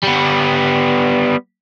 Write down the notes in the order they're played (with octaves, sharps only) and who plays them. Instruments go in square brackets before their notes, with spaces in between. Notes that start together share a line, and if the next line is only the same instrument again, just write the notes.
[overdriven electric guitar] G3 B3